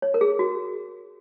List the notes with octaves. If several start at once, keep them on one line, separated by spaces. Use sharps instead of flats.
C#5
A#4
G#4
F#4